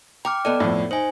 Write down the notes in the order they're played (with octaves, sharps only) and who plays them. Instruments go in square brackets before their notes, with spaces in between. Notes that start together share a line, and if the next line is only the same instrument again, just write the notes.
[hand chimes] G5 D6 F6 [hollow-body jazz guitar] A#5
[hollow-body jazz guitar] B3 A4 D#5 [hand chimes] D5
[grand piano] F2 A2
[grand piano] D#4 [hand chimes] C5 G#5